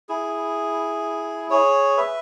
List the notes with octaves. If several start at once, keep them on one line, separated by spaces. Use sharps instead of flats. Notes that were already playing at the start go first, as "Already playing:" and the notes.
E4 G#4
G#4 C#5
B4 E5